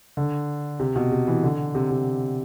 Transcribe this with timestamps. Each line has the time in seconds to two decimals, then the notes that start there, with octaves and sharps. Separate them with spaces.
0.17 D3
0.79 C3
0.96 B2
1.12 C3
1.27 E3
1.43 D3
1.75 C3
1.91 C3